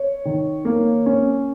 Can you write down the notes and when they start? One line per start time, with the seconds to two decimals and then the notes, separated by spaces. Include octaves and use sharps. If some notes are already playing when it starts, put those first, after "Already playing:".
Already playing: C#5
0.25 D#3
0.65 A#3
1.06 C#4